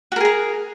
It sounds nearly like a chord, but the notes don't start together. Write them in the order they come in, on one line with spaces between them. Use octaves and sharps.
F#4 A#4 G#4 A#5